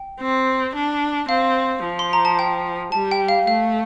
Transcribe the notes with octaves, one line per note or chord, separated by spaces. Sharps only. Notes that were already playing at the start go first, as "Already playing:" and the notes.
Already playing: G5
C4
D4
C4 F5
F3
C6
A#5
A5
G5
G3 A5
G5
F5
A3 F5